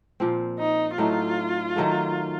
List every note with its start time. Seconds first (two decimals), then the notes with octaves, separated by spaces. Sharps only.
0.20 A#2 F3 C4
0.59 D#4
0.98 A2 F#3 A3 D#4 F4
1.76 D#3 F#3 A3